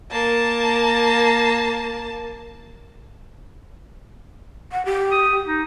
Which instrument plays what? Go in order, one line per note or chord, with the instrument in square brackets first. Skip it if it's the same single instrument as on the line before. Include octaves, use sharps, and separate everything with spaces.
[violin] A#3 A5
[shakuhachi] F#5
G4
[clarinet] D#6
D#4